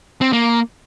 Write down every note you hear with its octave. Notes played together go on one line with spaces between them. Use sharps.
C4
A#3